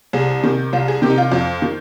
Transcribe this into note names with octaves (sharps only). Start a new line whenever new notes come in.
C2 G#4
C3 D#3
C2 F4
G#4
C3 D#3 G4
D#4
F4
F2 F4
D#3